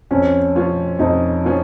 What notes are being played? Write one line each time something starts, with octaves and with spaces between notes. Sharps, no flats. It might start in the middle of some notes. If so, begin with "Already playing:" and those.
F2 C#4
F3 C#4 F4
F2 D#4
F3 C#4 F4